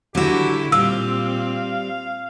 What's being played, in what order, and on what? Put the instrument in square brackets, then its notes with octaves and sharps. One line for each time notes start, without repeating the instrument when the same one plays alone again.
[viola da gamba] D3 E4 [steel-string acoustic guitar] F#3 F#4 [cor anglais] G4
[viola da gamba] A#2 C4 [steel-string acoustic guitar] G3 G4 [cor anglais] F5 [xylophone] E6